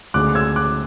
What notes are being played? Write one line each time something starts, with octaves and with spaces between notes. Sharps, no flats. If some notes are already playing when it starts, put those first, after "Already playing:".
D2 C#3 G#3 D6 F#6
E6 G#6
D6 F#6